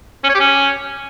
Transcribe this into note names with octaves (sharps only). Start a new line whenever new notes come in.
C#4
C#5
G4
C#4